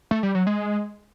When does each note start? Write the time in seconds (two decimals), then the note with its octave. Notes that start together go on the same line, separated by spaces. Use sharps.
0.11 A3
0.23 G3
0.35 F#3
0.47 G#3